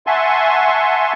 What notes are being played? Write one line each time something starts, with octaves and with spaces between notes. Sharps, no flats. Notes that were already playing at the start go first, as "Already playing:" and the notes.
E5 F#5 G#5 A5 C6 C#6